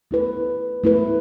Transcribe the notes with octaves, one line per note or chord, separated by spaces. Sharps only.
A3 E4 B4
A3 E4 B4